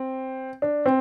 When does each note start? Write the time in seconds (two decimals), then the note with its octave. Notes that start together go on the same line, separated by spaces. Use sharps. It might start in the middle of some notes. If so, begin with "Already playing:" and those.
Already playing: C4
0.62 D4
0.86 C4